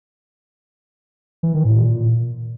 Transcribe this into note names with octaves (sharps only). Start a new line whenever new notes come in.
E3
D#3
A2
A#2